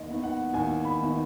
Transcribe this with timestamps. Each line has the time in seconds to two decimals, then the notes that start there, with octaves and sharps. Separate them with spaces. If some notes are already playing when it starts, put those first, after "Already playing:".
Already playing: D#2 D#5
0.09 D#3 B3 D#4
0.23 F#5
0.54 D#2 G#5
0.85 B5
1.00 D#3 B3 D#4